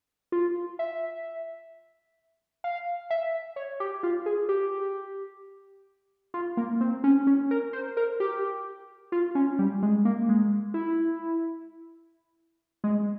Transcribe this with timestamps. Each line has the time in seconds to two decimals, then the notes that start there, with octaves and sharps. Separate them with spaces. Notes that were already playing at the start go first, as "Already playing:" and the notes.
0.32 F4
0.79 E5
2.64 F5
3.10 E5
3.56 C#5
3.80 G4
4.03 F4
4.26 G#4
4.49 G4
6.34 F4
6.57 A#3
6.81 C4
7.04 C#4
7.27 C#4
7.51 A#4
7.73 C5
7.97 A#4
8.20 G4
9.12 F4
9.35 C#4
9.59 G3
9.83 G#3
10.05 A#3
10.29 G#3
10.74 E4
12.84 G#3